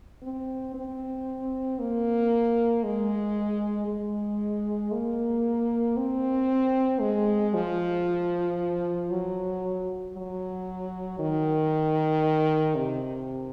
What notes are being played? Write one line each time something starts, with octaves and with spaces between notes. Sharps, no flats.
C4
C4
A#3
G#3
G#3
A#3
C4
G#3
F3
F#3
F#3
D#3
C3